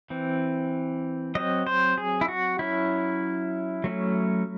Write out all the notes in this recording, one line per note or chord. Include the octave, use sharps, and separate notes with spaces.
E3 C4
F#3 C4 D#5
C5
G#4
E4
F#4
F#3 C#4 E4
F#3 A3 C#4